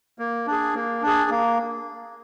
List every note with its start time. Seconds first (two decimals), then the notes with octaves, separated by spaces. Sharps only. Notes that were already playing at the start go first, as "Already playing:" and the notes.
0.19 A#3
0.47 D4 G#4
0.75 A#3
1.02 D4 G#4
1.30 A#3